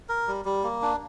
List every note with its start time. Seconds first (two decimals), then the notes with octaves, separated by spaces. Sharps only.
0.09 A#4
0.27 G3
0.45 G3
0.64 A#3
0.82 D4